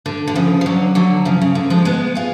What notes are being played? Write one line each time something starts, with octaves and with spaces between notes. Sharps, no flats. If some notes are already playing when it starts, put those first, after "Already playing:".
D3
D3
C#3 F3
F3
D3 F#3
D3 F#3
C#3 F3
C#3
D3
F3 G#3
G#3 B3
F4 G#4